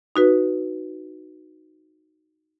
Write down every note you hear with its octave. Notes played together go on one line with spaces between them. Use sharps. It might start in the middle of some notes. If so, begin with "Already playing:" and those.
D#4 F#4 B4